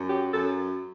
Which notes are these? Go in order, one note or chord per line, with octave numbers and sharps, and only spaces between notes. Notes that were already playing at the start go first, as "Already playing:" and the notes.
Already playing: F#2
F#3 G4
F#2 A4